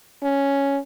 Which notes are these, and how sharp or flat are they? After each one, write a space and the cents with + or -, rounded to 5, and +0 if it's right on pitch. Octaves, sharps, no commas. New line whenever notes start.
C#4 +5